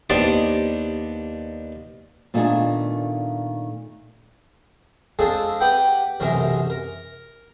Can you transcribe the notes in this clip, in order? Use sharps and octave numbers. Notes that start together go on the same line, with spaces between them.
D#2 B3 D4 G4 C5 D5
A#2 D#3 A3 B3 D4 G#4
G#3 C4 D4 F4 G#4 A4
G4 B4 F#5 G5
B1 F#2 C3 E3 G#3 A#4
A#4